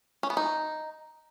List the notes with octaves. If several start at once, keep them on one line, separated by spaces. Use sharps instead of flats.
C#4
B3
D#4